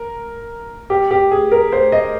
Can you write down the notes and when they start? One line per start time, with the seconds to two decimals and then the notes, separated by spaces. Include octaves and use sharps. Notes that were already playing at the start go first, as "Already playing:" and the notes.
Already playing: A#4
0.90 G4
1.11 G4
1.31 G#4
1.51 A#4
1.72 C5
1.92 D#5